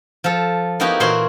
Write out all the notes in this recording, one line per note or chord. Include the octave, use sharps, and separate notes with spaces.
F3 A4
A#3 B3 D#4 E4 F#4 G4
A#2 E3 F#4 C5 C#5 C6